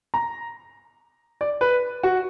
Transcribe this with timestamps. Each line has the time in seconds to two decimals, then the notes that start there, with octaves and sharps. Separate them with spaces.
0.14 A#5
1.41 D5
1.61 B4
2.03 F#4